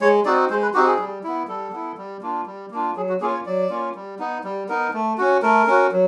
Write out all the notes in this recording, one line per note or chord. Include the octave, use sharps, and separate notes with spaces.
G#3 C#5
C4 D#4 F#4 D5
G#3 C5
B4
C4 D#4 F#4 G4
G#4
G3
B3 E4
G3 A4
B3 E4
G3
A#3 D4 F4
G3
A#3 D4 F4
F#3 G#4
F#4
A#3 C#4 F4 G#4
C#5
F#3 D5
A#3 C#4 F4
G3
B3 D#4
G3
B3 D#4 A#4
A3
C#4 F#4
A3 A#4
C#4 F#4
F#3